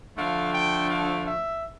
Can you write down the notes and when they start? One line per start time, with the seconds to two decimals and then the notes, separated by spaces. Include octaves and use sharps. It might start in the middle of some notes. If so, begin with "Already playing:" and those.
0.17 D3 F3 A3 D4 F5
0.53 G5
0.89 F5
1.26 E5